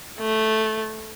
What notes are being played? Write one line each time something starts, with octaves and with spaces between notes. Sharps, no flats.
A3